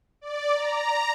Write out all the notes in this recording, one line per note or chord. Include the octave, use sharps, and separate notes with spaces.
D5
A#5